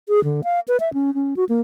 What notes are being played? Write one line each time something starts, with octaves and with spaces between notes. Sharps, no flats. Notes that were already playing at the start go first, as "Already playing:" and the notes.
G#4
D3
F5
B4
E5
C#4
C#4
F#4
A#3